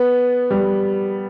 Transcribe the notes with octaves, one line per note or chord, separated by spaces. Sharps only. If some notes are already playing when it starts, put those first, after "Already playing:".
Already playing: B3
G3